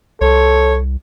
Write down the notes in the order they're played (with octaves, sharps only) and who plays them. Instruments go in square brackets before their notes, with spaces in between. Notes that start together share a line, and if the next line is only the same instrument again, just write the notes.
[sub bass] C2 [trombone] A4 [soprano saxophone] C#5